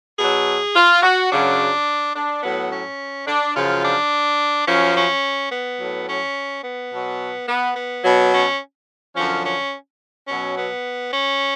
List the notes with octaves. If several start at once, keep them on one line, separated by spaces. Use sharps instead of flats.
B2 F#3 G#4
F4
F#4
F#2 C#3 F#3 D4
D4
A2 F#3 B3
C#4
D4
F#2 C#3 F3 F4
D4
F#2 F3 C#4
C#4
B3
A2 F#3
C#4
B3
B2 F#3
B3
B3
B2 F#3
C#4
F#2 D3 F3 C#4
C#4
B2 F#3 C#4
B3
C#4